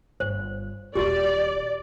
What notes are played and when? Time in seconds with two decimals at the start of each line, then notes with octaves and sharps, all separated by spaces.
0.20 G1 C5
0.95 D#1 D#3 F#4 G4 D5